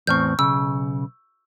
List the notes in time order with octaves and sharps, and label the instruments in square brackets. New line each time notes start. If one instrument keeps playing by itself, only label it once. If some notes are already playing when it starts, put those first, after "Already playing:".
[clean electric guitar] E2 A2 C4 [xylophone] C#6 F6 G6
[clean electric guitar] B1 C#3 [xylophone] E6